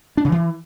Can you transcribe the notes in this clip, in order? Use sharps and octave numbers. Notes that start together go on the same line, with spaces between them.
D4
C#3
E3